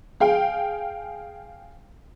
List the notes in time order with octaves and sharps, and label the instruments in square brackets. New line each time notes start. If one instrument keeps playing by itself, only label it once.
[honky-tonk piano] G#4 F5 G5